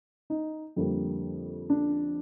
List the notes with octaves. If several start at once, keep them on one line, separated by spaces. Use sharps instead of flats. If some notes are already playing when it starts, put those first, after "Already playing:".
D#4
F2 D3 G3 A#3
D4